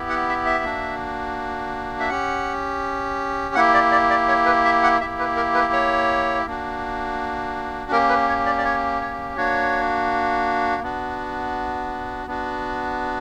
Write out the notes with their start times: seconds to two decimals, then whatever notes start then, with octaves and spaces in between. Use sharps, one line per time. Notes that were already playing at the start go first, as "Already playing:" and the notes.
Already playing: B3 E4 G4
0.10 F#5
0.29 E5
0.46 E5
0.64 A#3 D4 F#4
2.00 E5
2.09 C#4 G4 F#5
3.55 A#3 E4 G4 F#5
3.74 D5
3.92 D5
4.10 D5
4.28 C#5
4.46 B4
4.65 E5
4.83 F#5
5.00 A#3 E4 G4 E5
5.19 B4
5.36 A#4
5.55 B4
5.73 C#5
6.46 A#3 D4 F#4
7.91 A#3 C#4 G4 A#4
8.09 B4
8.28 C#5
8.46 D5
8.58 D5
8.65 C#5
9.01 C#5
9.37 A#3 D4 F#4 C#5
10.82 B3 D4 F#4
12.27 B3 D4 F#4